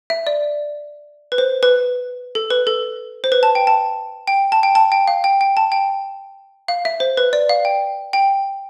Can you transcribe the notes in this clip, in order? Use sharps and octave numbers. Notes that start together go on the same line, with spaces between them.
E5
D5
B4
C5
B4
A4
B4
A4
C5
B4
A5
G5
A5
G5
A5
G5
A5
G5
F5
G5
G5
A5
G5
F5
E5
C5
B4
D5
F5
G5
G5